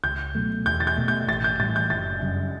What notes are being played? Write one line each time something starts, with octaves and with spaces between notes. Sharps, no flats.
C#2 G6
B2 F#3 A3
E2 G6
A6
G6
B2 A3
G6
A1 A6
G6
A2 E3 G3 A6
G6
F#1 A6
F#2 C#3 G3